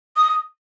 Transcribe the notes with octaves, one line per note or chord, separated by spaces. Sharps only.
D#6